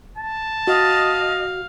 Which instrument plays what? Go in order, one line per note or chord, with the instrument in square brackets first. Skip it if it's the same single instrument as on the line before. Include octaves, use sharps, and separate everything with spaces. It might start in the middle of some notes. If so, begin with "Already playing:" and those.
[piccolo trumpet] A5
[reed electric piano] F#4 [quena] D#5 [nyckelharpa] F5